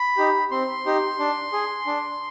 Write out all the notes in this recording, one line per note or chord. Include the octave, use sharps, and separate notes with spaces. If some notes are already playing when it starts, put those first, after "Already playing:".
Already playing: B5
D#4 G4
C4 C6
D#4 G4
D4
G#4
D4